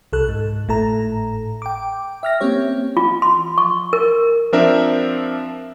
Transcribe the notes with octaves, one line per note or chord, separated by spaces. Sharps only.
C2 A4 F#6
G#2
G#1 A2 A4 A#5
G5 D6
E5 F6 A#6
A#3 C4 C#4 G4 C#5
F4
C6
C#6
A#4
F3 C4 D4 A#4 C5 E5